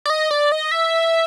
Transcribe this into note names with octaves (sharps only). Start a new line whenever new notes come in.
D5
D#5
D5
D#5
E5